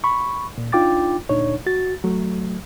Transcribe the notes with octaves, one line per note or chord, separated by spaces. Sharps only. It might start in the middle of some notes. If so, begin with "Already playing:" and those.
B5 C#6
A#2
D4 D#4 F4 G5 D6 A6
D2 A#2 D4 D#4 C#5
F#4 A6
F#3 A3